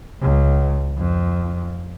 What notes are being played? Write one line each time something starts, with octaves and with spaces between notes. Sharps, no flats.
C#2
F2